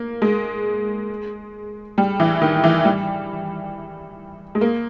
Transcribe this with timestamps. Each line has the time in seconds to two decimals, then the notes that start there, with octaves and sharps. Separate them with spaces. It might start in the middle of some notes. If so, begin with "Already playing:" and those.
Already playing: A#3
0.22 G#3
1.98 G3
2.20 E3
2.42 D#3
2.64 E3
2.85 G3
4.55 G#3
4.61 A#3